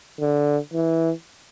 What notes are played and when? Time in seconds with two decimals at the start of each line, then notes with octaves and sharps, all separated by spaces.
0.20 D3
0.74 E3